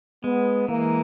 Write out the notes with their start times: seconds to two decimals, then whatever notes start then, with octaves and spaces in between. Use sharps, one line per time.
0.23 G#3 B3
0.68 E3 A#3